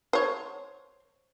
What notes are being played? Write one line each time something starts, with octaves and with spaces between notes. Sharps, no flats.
C5 C#5